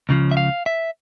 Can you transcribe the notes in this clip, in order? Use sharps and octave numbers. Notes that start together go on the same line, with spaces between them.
C#2 C#3 F3
E5
F5
E5